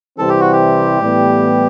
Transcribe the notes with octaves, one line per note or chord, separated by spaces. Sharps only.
C2 C3 E3 G3 C4 A4
G4
F#4
G4
A2 E3 G3 B3